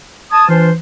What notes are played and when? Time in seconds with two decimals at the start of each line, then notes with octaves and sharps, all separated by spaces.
0.31 A5 D#6 G#6
0.49 E3 D4 F4 C5